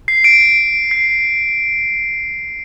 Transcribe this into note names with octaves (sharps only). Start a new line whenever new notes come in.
C7
D7
C7